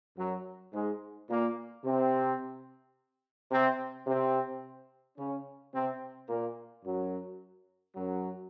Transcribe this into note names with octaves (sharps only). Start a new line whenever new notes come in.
F#2 F#3
G#2 G#3
A#2 A#3
C3 C4
C3 C4
C3 C4
C#3 C#4
C3 C4
A#2 A#3
F#2 F#3
F#2 F#3